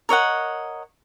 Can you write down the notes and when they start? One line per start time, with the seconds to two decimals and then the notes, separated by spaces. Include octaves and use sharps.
0.09 A#4 C#5 D#5 F#5